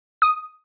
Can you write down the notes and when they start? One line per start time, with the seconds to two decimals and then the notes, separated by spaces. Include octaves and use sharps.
0.22 D#6